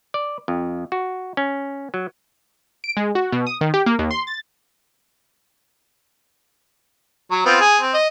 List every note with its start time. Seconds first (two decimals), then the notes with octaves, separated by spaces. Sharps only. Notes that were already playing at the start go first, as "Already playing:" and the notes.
0.14 D5
0.48 F2
0.92 F#4
1.37 C#4
1.94 F#3
2.84 D7
2.97 G#3
3.15 F#4
3.32 B2
3.47 D#6
3.61 D#3
3.74 G4
3.86 A#3
3.99 D#2
4.11 C6
4.27 A6
7.31 F#3
7.46 B3 C4 F4
7.60 G#4
7.81 C4
7.93 D#5